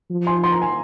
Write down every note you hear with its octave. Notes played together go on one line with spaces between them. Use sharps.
F3
G#5 C6
C6
A#5
G#5